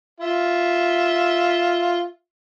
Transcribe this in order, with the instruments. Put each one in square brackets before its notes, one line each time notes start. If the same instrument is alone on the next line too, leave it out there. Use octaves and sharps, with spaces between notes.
[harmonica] F4 E5